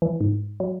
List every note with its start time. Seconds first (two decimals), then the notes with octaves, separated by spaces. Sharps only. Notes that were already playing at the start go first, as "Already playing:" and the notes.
0.02 E3
0.21 G#2
0.60 F#3